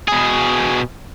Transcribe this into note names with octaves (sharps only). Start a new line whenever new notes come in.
B2 G#4